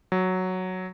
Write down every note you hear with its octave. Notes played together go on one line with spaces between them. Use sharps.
F#3